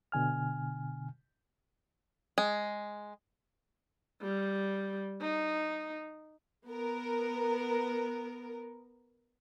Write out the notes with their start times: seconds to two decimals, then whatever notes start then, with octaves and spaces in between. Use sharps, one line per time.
0.12 B2 D3 G#5 F6
2.38 G#3
4.22 G3
5.21 D#4
6.65 B3 A#4